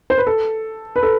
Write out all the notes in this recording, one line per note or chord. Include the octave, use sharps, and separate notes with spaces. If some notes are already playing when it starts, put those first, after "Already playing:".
C5
B4
A4
B4
A4